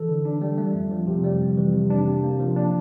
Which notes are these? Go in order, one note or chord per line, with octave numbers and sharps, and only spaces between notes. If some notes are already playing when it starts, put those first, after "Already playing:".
Already playing: E3 A4
D3
D4
G3
A3
F2
F3
C3
G3
F2
E3
C3
D4
C3
A#3
F3
D4